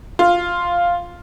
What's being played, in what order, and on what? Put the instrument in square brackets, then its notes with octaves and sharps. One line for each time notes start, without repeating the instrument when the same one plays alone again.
[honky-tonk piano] F4